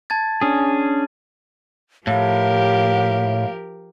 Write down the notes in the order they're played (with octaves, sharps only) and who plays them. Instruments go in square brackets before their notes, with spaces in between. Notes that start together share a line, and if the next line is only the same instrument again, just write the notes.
[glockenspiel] A5 G#6 A6
[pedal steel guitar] C#4 G#4 [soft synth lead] D4
[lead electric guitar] A2 [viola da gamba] F3 G4 A#4 [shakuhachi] F5